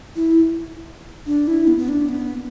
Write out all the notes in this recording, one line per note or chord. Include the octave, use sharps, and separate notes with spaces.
E4
D4
E4
B3
B3
D4
B3